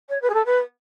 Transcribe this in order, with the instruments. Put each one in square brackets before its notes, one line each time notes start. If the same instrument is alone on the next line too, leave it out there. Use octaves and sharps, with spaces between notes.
[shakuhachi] C#5
B4
G#4
A4
B4